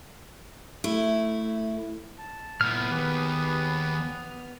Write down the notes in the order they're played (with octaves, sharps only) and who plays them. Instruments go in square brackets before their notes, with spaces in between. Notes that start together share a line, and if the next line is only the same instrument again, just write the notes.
[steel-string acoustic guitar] A3 E4
[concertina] A5
[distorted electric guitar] A#2 E4 [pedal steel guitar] B3 F6
[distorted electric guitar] D#2 [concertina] G4 G#4 B4